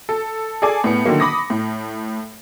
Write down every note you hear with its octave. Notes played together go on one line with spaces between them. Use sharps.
A4
G#4 A4 D5 G#5 D6
A2 B3 C#7
D3 D#3 F#3 A#3
B5 D6 D#6 A#6
A2